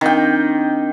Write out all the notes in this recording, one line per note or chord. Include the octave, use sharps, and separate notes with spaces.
D#3 C4 D4 G5